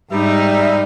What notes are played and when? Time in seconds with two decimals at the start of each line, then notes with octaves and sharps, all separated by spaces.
0.12 G#2 G3 D#4 E5